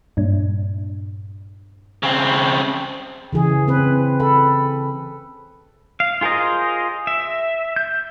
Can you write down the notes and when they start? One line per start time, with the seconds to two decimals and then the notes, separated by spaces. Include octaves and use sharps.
0.17 G2 A#2 D4
2.03 C#3 C4
3.33 C#3 E3 G#4
3.68 C4 B4
4.20 A4 B5
6.00 F5
6.21 F4 G#4 A#4 C5 D#5
7.07 E5
7.76 G6